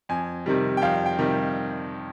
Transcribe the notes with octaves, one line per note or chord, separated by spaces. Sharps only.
F2 G#5
C3 D#3 G3
G5
F2 F5
G5
C3 D#3 G3